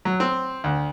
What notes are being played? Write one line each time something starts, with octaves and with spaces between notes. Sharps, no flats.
F#3
C4
D2